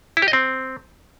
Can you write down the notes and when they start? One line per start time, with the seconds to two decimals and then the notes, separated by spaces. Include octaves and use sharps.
0.17 E4
0.22 G4
0.28 D#5
0.33 C4